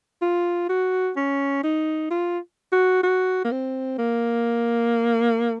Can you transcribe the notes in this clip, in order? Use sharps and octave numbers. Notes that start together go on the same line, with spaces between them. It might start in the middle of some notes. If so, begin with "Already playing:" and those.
F4
F#4
C#4
D#4
F4
F#4
F#4
A#3
C4
A#3